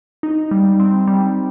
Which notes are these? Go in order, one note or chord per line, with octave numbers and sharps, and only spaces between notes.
D#4
G3
C4
G3